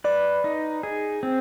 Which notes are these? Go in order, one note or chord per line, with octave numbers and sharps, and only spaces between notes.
B4 D5
D#4
G#4
C4